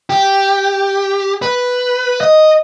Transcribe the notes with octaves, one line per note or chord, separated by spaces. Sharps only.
G4
B4
D#5